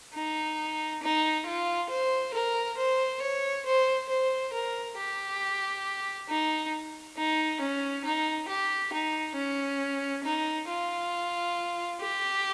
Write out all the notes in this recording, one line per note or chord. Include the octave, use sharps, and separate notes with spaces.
D#4
D#4
F4
C5
A#4
C5
C#5
C5
C5
A#4
G4
D#4
D#4
C#4
D#4
G4
D#4
C#4
D#4
F4
G4